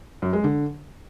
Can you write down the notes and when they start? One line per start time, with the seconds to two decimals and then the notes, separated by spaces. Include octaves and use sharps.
0.22 F#2
0.33 G#3
0.44 D3